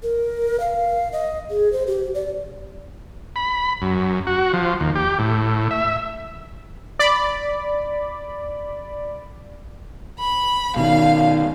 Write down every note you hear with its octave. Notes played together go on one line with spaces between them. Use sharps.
A#4
F5
D#5
G#4
C5
G4
D5
B5
F#2
F#4
F3
D#2
G4
A2
E5
D5 B5
B5
B2 D#3 F5